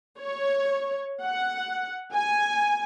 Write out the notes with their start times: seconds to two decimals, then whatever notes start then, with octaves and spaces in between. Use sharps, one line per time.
0.19 C#5
1.23 F#5
2.14 G#5